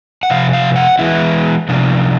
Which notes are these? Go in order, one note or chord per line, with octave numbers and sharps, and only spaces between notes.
F#5
C3 F3 F5
F5
F#5
E3 G#3 B3 E4
C3 F3 A#3 D4 F4